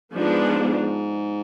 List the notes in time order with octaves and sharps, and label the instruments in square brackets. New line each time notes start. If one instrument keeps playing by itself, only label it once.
[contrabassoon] G#2 [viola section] F3 G#3 B3 D4